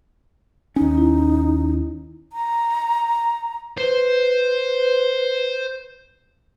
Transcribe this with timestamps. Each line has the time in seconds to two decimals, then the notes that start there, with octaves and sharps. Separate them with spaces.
0.76 D#2 C#4 D#4
0.97 E4
2.33 A#5
3.78 B4 C5